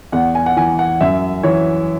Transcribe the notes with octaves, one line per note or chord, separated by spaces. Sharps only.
E2 F#5
G#5
F#5
E3 G#5
F#5
F#2 E5
E3 C#5